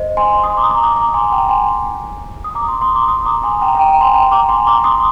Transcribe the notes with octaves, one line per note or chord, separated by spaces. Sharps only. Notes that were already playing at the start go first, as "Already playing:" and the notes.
Already playing: C5 D#5
G#5 C6
C6 D#6
A#5 D6
D#6
A#5 D6
A#5 D6
A#5 D6
G#5 C6
G5 A#5
G#5 C6
D#6
A#5 D6
C6 D#6
C6 D#6
A#5 D6
C6 D#6
A#5 D6
G#5 C6
G5 A#5
G5 A#5
G5 A#5
G#5 C6
G5 A#5
A#5 D6
G#5 C6
A#5 D6
C6 D#6